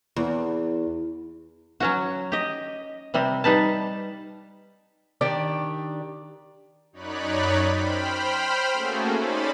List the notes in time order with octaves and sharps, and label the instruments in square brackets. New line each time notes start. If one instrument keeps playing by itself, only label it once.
[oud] E2
[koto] F#3 C#4 F#4
G4 D#5
C3 G3 C4
G3 D#4 B4 A5
[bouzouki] D#3 D4 G4 D5
[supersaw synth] F#2 D#4 C#5 D5 B5 F#6
C5 G5 B5 F6
A3 A#3 C#4 F#4 G#4 A4
C#4 D#4 C5 D5 B5 A6